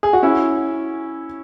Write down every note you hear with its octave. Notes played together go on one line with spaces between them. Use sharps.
G#4
F#4
C#4 E4